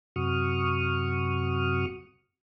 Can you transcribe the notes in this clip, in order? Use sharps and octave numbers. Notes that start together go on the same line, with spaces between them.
F#2 C3 F#4 C#6 D#6 F6